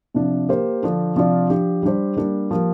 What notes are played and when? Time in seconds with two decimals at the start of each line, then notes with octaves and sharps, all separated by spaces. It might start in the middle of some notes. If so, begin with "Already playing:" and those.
0.14 C3 F3 D4
0.49 A#3 G4 C5
0.83 D3 F3 D4
1.15 C3 F3 D4 F4 D5
1.50 F3 D4 G4
1.83 G3 D4 G4 C5
2.17 G3 A#3 D4 G4
2.51 F3 A#3 G4